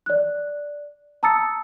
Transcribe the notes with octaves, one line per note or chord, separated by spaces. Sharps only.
D5 F#6
A5 A#5 D#6 E6 A6 C#7